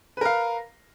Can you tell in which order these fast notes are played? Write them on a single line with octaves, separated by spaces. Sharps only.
B4 A#4 F5